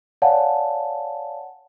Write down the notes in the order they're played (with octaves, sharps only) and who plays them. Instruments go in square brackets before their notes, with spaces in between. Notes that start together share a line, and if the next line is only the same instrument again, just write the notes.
[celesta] C#5 D5 F5 F#5 G#5 A5